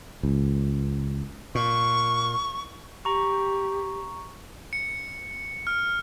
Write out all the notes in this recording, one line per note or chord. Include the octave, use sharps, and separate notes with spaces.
C#2
A#2 C#6
G4 A#5 C#6
C#7
F6